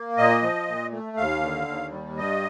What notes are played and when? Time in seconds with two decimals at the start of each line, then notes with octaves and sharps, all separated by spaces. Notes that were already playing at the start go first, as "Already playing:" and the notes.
Already playing: A#3
0.17 A#2 D#5
0.43 F3
0.68 A#2
0.92 A3
1.17 D#2 F5
1.43 D3
1.68 D#2
1.92 G3
2.17 G2 D#5